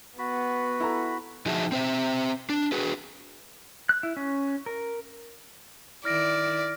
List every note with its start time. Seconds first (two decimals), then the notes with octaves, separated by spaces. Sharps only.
0.19 B3 F#4 B5
0.80 E4 A4 A#5
1.46 F3 D#4 F#4 G#4 E5 A5
1.72 C4 C5 E5
2.50 D4
2.72 F#4 G#4 B4
3.89 F#6
4.03 E4
4.17 C#4
4.66 A#4
6.05 D#3 E4 D5 F6 A#6 D7